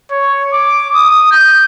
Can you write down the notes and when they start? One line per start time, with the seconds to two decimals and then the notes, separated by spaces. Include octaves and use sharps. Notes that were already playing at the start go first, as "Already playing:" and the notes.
0.11 C#5
0.53 D6
0.95 D#6
1.31 G6